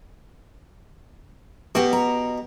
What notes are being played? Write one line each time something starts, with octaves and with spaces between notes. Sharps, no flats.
B2 F#4 G4
A#5